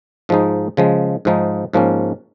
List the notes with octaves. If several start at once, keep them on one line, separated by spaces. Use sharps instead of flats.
G#2 F3 G#3 D#4
C#3 F3 G#3
G#2 F3 G#3 D#4
G#2 F3 A#3 C#4